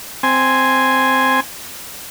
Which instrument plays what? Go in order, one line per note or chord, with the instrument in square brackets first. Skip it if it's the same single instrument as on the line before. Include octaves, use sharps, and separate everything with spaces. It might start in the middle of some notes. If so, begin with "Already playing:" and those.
[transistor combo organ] C4 G#5